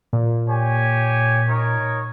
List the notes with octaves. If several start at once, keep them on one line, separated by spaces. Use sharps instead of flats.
A#2
G4 C#5 G#5
D#4 A#4 C#5